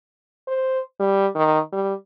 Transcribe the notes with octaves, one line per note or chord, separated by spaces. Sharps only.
C5
G3
D#3
G3